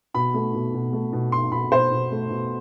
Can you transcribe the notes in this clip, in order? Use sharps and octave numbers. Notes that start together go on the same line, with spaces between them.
B2 B5
A3
B2
B2
A3
B2
B2 C6
B2 B5
B2 C5
B2
A3
B2